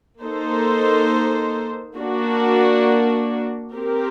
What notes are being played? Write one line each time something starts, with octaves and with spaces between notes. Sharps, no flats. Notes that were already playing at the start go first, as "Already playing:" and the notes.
A#3 D#4 A4 C5
A#3 D4 F#4
C4 G4 A#4